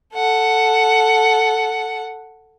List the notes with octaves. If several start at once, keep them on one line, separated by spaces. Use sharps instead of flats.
A4 F#5